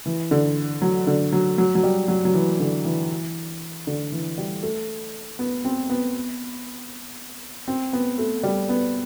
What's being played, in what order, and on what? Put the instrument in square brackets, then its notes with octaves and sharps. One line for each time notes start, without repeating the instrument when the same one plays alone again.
[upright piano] E3
D3
F#3
D3
F#3
F#3
F#3
G3
F#3
F#3
E3
D3
E3
D3
E3
G3
A3
B3
C4
B3
C4
B3
A3
G3
B3